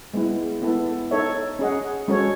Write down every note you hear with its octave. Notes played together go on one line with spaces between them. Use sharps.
G#3 B3 E4
B3 E4 A4
D#4 A4 C#5 E5
C#4 G#4 D#5 F#5
G#3 C#4 F#4 A4 C#5